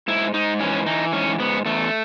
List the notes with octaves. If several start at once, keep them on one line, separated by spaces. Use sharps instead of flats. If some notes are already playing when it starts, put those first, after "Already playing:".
G#2 E4
G#2 D#4
E3 C#4
E3 D#4
G#2 C#4
G#2 B3
E2 A3